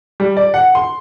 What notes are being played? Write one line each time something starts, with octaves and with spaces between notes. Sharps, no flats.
G3
D5
F#5
C6